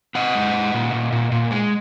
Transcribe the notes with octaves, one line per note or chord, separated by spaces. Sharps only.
C4 D#5 F#5
G#3
G#3
A#2
A#2
A#2
A#2
G#3